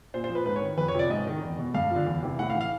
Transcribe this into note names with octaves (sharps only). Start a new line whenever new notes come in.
A#2 C5
C5
F3
B4
G#2 B4
C#5
D#3
F2 B4
C#5
C3 F3 D5
G#2 D#5
D#3
E2
B2
G2 F5
D3 F3
E2
C3 E3
A2 F#5
F5
E3
F5